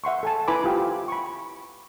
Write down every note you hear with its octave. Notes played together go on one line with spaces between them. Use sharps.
E5 F#5 C6 C#6
A4 G#5 A5
E4 B4 G#5 B5 C6 D6
F4 G4 G5
B5 C#6